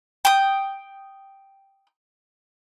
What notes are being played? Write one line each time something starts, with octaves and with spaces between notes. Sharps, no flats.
G5 D#6